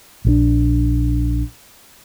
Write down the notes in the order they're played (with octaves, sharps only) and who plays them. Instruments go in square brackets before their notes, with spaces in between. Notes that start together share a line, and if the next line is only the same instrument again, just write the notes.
[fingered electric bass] A#1 F3 D4